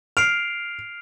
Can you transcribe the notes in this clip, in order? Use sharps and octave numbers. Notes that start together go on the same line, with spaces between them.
F6 C7 D7 F7